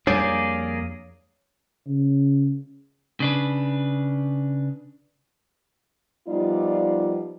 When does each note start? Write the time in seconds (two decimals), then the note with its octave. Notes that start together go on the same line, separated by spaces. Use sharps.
0.07 F2 G3 A#3 D4 G#4 C#5 D5
1.87 C#3
3.20 C#3 D4 B4
6.28 F3 G3 B3 D#4 F4 D5